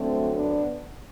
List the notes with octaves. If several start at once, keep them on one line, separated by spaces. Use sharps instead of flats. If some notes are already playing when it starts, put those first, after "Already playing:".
Already playing: D2 D3 F#3 A3 C4
B3 D4